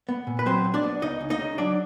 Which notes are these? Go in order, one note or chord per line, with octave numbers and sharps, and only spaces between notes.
B3
A#2
B4
F#3 C4 C5
B1
D4 D5
B3
C#2 D#4 D#5
C#2
D#4 D#5
C#3
F#3 D4 D5